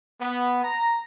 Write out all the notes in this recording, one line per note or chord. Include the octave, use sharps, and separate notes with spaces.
B3
A#5